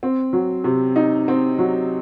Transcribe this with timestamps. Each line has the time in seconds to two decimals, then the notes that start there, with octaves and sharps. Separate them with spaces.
0.03 C4
0.33 F#3
0.64 C3
0.96 D#4
1.28 C4
1.58 F#3